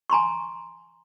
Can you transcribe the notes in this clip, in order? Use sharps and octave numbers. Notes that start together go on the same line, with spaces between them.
G#5 A#5 C6 C#6